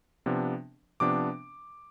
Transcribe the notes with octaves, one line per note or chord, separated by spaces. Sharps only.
C3 F3 B3 D4
C3 F3 B3 D4 D6